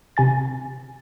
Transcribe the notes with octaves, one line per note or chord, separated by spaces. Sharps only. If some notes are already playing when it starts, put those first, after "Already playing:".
C3 G#5 A6